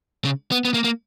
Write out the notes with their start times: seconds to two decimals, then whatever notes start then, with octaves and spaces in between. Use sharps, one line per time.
0.25 C#3
0.52 B3
0.65 B3
0.74 A#3
0.84 A#3